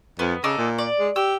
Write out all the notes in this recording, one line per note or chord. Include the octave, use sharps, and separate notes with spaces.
F2 B3
C#3 D#4 A4 D6
A#2
D5
G#3
G4 E6